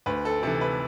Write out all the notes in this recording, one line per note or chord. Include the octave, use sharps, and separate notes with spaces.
D2 B4
A4
C3 E3 A4
B4